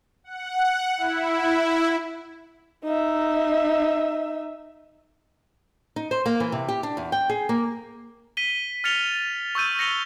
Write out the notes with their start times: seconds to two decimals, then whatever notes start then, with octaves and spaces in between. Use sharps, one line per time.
0.24 F#5
0.97 E4
2.84 D#4 E5
5.96 D#4
6.11 C5
6.26 A#3
6.40 E3
6.52 C3
6.68 G4
6.83 D4
6.97 E2
7.12 G5
7.30 G#4
7.49 A#3
8.37 B6 D#7 G7
8.84 F6 A6 C#7 F7 G7
9.55 C#6 E6 G6 D#7
9.79 A#6 C#7 F7 G7